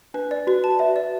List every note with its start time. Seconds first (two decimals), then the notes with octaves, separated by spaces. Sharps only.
0.14 D4 B4
0.31 D5
0.47 F#4 B4
0.64 A5
0.79 B4 E5
0.96 D5